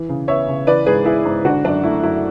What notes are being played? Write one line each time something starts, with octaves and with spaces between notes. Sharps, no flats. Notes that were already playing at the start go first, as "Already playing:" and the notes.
Already playing: E3
C#3
B3 C#5 E5
C#3
E3 B4 D5
G#2 G#4 B4
B3 E4 G#4
G#2
D3 D4 F#4
F#2 D4
A3 E4
F#2 E4